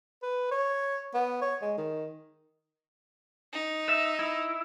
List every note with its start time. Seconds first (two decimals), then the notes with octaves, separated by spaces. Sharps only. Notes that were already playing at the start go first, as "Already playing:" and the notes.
0.23 B4
0.51 C#5
1.14 B3
1.42 C#5
1.62 G#3
1.77 D#3
3.53 D#4
3.89 E5
4.19 E4